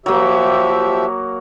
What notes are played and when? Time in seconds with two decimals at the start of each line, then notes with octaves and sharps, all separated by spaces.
0.06 F3 F#3 A#3 G4 E5